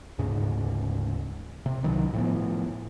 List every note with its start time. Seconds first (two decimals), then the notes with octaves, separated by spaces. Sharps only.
0.19 D2 G#2 C#3
1.66 C3
1.83 C2 D#3 F#3
2.13 A2 F3 B3